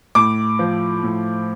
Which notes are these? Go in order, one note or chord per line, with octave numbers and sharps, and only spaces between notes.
A2 D6
F3
A2